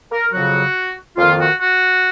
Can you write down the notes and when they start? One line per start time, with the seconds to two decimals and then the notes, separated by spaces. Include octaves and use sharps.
0.12 A#4
0.32 F2 C#3 F#3 F#4
1.17 F2 D#3 A#3 F4
1.39 F#4
1.59 F#4